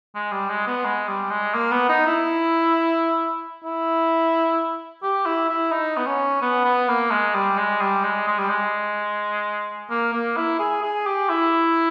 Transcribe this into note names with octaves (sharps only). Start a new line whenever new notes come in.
G#3
G3
G#3
B3
G#3
G3
G#3
A#3
B3
D#4
E4
E4
G4
E4
E4
D#4
B3
C#4
B3
B3
A#3
G#3
G3
G#3
G3
G#3
G#3
G3
G#3
A#3
A#3
E4
G#4
G#4
G4
E4